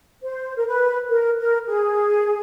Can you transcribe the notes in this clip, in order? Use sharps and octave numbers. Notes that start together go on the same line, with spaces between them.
C5
A#4
B4
A#4
A#4
G#4